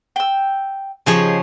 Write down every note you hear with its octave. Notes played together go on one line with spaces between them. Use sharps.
G5 E6
C#3 F3 G4 G#4 C#5 D#5